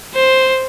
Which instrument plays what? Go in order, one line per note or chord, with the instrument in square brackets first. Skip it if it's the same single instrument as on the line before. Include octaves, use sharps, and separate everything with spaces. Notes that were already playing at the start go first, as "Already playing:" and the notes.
[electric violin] C5